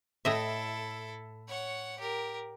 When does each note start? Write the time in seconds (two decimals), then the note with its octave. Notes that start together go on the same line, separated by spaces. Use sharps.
0.25 A2 E4 A4 D#5 E5
1.47 C#5 F#5
1.98 G4 A#4